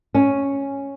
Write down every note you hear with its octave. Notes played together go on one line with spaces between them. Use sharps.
C#4